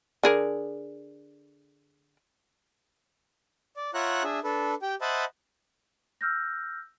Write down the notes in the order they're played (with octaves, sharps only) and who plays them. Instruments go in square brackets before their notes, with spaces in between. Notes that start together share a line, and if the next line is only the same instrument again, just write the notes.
[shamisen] D3 G#4 A#4
[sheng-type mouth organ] D5
F4 C#5 E5 F#5 A#5 F#6
D4 G#4 E5
D4 A4 B4
G4 G5
C5 D#5 E5 F#5 A5 B5
[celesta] E6 F6 G6 A#6